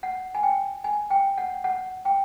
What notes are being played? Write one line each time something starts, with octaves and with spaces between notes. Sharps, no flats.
F#5
G#5
G5
G#5
G5
F#5
F#5
G5